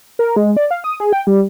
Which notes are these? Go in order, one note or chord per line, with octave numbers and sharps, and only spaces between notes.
A#4
G#3
D5
F5
D#6
G#4
G5
G3